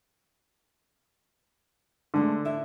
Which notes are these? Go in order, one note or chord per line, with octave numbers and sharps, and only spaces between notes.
D3 G#3 A3
E4 E5